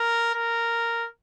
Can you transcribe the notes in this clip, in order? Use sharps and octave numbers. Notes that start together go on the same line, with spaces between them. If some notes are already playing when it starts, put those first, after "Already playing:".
Already playing: A#4
A#4